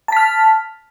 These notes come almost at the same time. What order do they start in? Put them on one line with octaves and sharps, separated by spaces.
A5 B6 F6